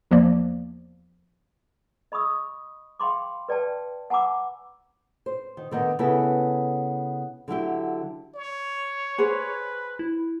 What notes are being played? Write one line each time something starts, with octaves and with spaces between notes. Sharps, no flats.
E2 F3 A#3 D5
D#5 B5 C#6 D#6 E6
F5 G5 B5 C6 D6
B4 D5 G5 A5
F#5 G#5 A#5 B5 D6 E6
C5
D#3
D3 D#3 B3 D#5
C#3 B3 E4 A4 B4
D3 F#3 E4 G4
C#5
G#4 B4 C5
E4